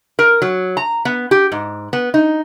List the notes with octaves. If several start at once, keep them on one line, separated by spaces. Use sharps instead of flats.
A#4
F#3
A#5
B3
G4
G#2
B3
D#4